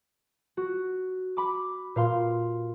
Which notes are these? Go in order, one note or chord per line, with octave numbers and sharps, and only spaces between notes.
F#4
B5 D6
A#2 F5 C6